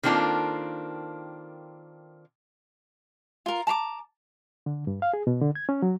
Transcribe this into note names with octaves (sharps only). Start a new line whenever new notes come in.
D#3 A#3 C4 D4 F4 A4
F4 A#4
A5 A#5 C6 D6
D3
G2
F5
G#4
B2
D3
G#6
C#4
F#3